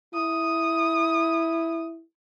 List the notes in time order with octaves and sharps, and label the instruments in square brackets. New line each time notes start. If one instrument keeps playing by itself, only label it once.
[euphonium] E4 [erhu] D#6